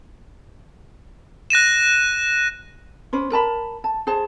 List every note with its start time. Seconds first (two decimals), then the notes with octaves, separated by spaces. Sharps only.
1.50 F#6 A#6 D#7 E7
3.13 C#4 B4 C5
3.32 A#4 A5 B5
3.84 A5
4.07 G#4 C5 A5